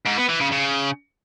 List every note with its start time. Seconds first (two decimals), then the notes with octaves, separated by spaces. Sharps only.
0.06 G#2
0.18 B3
0.29 E3
0.41 C#3
0.52 C#3